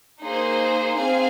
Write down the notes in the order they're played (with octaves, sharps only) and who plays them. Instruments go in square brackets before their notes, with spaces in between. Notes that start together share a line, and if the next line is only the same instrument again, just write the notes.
[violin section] A#3 D#4 G#4 C5
C4 G#4 F5 G#5